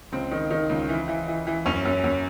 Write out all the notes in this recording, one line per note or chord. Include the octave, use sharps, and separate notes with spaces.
C#2 C4
D#3
D#3
C#2
E3
E3
E3
E3
F#2 C#4
F#2
F#2